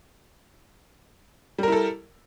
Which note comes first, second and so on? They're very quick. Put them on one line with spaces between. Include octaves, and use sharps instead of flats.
G3 A#4 E4 A4